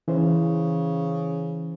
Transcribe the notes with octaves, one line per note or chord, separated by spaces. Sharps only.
C#3 E3 C5